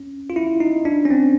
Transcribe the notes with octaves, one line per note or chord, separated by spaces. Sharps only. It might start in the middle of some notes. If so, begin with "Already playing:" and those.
Already playing: C#4
F4
E4
D#4
D4
C#4
C4